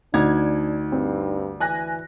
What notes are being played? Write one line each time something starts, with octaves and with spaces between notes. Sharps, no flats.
D2 D4 D#4 G#6
G2 C4
E3 G#5 F#6 A#6